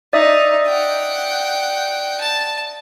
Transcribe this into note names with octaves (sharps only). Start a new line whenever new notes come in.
D#4 D5 E5 D#6
F#5 G5
A5